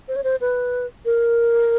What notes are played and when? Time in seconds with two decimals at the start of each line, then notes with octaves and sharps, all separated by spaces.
0.08 C5
0.16 C#5
0.24 C5
0.41 B4
1.05 A#4